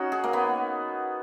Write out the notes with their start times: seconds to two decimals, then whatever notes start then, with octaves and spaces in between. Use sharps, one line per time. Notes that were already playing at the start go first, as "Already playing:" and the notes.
Already playing: C#4 D#4 F#4
0.12 G#4
0.24 A#3
0.33 B3